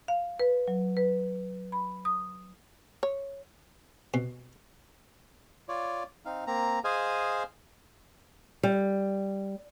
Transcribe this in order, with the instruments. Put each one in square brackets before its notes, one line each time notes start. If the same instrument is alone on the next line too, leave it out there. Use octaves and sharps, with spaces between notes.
[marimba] F5
B4
F#3
B4
B5
D#6
[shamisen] C#5
[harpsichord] B2
[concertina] F4 C#5 D5
C4 D#4 F5
A#3 C4 A#5
G#4 C5 D#5 F5 G#5
[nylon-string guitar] G3